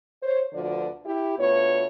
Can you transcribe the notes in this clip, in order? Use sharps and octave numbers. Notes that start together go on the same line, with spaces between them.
C5 C#5
D2 B2 D3 F3 D5
E4 G4
D2 A3 B3 F4 C#5